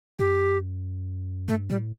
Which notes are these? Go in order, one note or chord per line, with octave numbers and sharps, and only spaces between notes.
F#2 G4
G2 A3
A2 G3